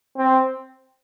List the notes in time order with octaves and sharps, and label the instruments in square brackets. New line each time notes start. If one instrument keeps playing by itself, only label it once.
[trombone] C4